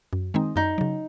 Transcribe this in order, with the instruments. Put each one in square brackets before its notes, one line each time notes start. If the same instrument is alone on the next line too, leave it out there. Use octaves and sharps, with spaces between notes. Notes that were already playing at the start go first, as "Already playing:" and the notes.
[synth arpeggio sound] F#2
D#3 G#3 C4 D#4
[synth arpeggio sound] F#2 [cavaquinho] D#4
[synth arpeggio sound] C#3 F#3